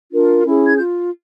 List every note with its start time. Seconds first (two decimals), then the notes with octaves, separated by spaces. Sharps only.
0.12 D4 F4 A#4
0.45 C#4 E4 G#4
0.66 G#6
0.77 F4 G6